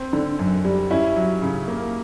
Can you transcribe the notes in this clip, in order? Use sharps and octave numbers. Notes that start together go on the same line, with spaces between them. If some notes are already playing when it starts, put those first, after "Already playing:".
Already playing: C4
D3
F#2
G3
C#4 E4
F#3
C#3
A#3